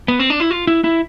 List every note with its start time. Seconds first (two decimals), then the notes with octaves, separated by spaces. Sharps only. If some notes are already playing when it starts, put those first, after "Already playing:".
0.08 B3
0.19 C4
0.30 D4
0.40 E4
0.51 F4
0.67 E4
0.84 E4